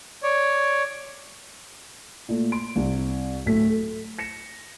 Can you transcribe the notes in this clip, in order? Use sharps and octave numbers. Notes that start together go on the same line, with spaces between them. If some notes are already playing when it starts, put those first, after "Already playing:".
C#5 D5
A#2 A3
C6 D7
C2 C3
D1 A2 A3 B6
A4
A#6 C#7 E7